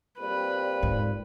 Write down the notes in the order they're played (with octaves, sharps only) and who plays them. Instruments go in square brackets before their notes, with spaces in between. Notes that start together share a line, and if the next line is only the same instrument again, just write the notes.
[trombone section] A#2 G3 C4 [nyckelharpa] B4
[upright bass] G#2